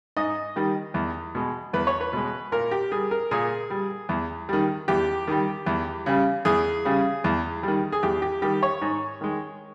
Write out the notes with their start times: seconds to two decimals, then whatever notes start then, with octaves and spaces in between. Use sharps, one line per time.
0.17 G#2 D#5
0.56 D#3 G3
0.94 E2
1.35 B2 G#3
1.73 E2 B4
1.87 C#5
2.01 B4
2.13 B2 G#3
2.52 A#2 A#4
2.71 G4
2.92 G3 G#4
3.11 A#4
3.31 A#2 G#4
3.70 G3
4.09 E2
4.49 D#3 G3
4.88 E2 G4
5.27 D#3 G3
5.66 E2
6.06 C#3 G3
6.45 E2 G#4
6.85 C#3 G3
7.24 E2
7.63 D#3 G3
7.92 G#4
8.03 E2 G4
8.22 G4
8.42 D#3 G3 G4
8.63 C#5
8.81 G#2
9.21 D#3 G#3